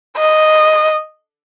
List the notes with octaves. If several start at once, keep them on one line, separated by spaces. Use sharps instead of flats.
D#5